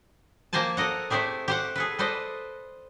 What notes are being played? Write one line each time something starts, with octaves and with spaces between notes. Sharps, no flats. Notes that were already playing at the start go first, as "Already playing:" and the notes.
F3 A#3 G4 C5 G#5 A5
A4 A#4 D#5 F#5
A3 C4 E4 G4 G#4
G4 C5 F#5
G#4 A4 B4
A4 B4 C5 D5 D#5